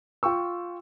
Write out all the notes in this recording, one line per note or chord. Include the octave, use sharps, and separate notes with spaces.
F4 G5 C#6 E6